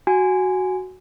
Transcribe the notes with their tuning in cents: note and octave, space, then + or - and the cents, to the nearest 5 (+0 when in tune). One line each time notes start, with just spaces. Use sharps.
F#4 +5 G#5 +0